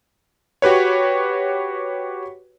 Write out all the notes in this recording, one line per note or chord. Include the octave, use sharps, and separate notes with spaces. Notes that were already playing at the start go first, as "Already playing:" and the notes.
F#4 G4 B4 C#5